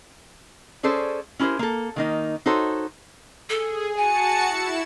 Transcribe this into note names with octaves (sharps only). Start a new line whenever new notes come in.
C#4 G#4 A4 C5 D5
C#4 E4 G4 A#4 C5
A#3 A4
D#3 A#3 D#4
D#4 F#4 A4 C5 C#5
G#4 A4
F#4 G#5 A5 C#7
E4 E7